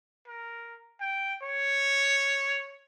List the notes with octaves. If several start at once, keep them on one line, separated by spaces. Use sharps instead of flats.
A#4
G5
C#5